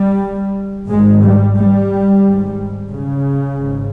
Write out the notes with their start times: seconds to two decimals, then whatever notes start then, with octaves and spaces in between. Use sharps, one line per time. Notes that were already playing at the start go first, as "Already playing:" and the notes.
Already playing: G3
0.89 G#1 G#2 G#3
1.23 G3
1.57 G3
2.24 G#1 G#2
2.91 C#3
3.58 G#1 G#2